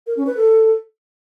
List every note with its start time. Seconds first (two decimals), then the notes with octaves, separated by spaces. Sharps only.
0.07 A#4
0.17 C#4
0.27 B4
0.37 A4